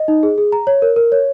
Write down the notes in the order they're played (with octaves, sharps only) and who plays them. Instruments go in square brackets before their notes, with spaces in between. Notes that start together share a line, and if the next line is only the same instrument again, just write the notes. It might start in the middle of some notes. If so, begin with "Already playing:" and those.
Already playing: [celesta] D#5
D#4
G#4
G#4
A#5
C#5
A#4
A#4
C#5